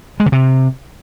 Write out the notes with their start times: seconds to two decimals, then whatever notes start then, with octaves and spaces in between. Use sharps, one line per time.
0.20 G#3
0.26 C#3
0.32 C3